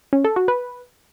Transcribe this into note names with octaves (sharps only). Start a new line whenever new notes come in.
C#4
A4
F#4
B4